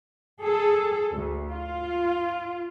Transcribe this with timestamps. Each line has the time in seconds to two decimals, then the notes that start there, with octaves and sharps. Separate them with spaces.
0.40 G#4 A4
1.11 D2
1.51 F4